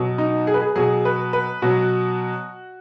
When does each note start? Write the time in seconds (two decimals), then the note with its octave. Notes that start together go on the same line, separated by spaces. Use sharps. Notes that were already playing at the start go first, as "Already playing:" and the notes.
Already playing: B2 F#3
0.18 D#4
0.47 G#4
0.54 B4
0.62 G#4
0.75 B2 F#3 G#4
1.05 B4
1.33 B4
1.62 B2 F#3 F#4